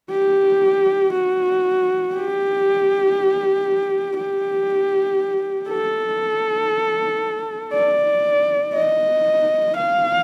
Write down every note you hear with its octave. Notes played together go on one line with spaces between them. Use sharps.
G4
F#4
G4
G4
A4
D5
D#5
F5